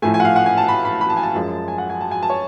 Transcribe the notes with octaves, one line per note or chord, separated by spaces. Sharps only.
A2 F3 A3 G#5
G#5
F#5
F5
F#5
G#5
A5
B5
B5
B5
A5
G#5
A5
F#2 F3 G#3
G#5
F#5
G#5
A5
G#5
A5
C#5